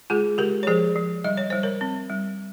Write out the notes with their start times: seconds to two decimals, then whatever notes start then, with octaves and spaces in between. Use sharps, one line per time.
0.10 G#3 F4 G#4
0.38 G#3 G4 A#4
0.63 C#5
0.67 F3 G#4 C5
0.96 F3
1.24 G3 D#5
1.37 C#5
1.50 G3 C5
1.63 A#4 C#5
1.81 C4
2.09 G3